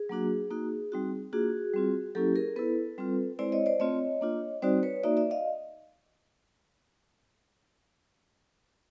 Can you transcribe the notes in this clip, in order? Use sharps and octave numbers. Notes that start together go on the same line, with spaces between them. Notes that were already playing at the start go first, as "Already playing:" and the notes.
Already playing: G#4
F#3 A#3 D4 F#4
A#3 D#4 F#4
G3 C4 D#4 F#4
A#3 D4 F4 F#4 G#4
G3 C4 F4
F#3 A#3 C#4 E4 G4 A4
G#4 A#4
B3 E4 A4 B4
G3 C4 F4
G#3 C4 E4 C5 D5
C#5 D#5
C5 D5
A3 C4 F4 C#5 D#5
A#3 D4 F4
G3 C4 D#4 F#4 C5 D5
B4 C#5
A#3 D#4 F#4 D5 E5
D5 E5
D#5 F5